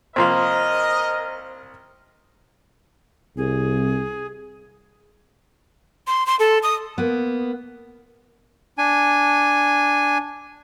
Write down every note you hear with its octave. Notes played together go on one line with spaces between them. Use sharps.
C2 F3 A#3 A#4 C5 D#5 A#5 C6
C2 G#4
C6
C6
A4
D#6
A#3 B3
D4 G#5